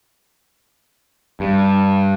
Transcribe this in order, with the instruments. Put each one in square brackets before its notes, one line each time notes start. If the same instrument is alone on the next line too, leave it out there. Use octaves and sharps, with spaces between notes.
[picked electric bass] G2